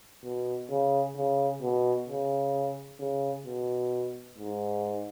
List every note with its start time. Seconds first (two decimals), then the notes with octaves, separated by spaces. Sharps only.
0.24 B2
0.71 C#3
1.17 C#3
1.62 B2
2.09 C#3
3.00 C#3
3.46 B2
4.38 G#2